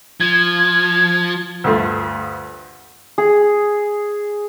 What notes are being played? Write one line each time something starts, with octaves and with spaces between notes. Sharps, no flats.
F3 G#6
D2 G2 A3 F4
G#4